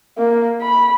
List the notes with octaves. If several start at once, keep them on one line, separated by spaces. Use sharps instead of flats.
A#3
B5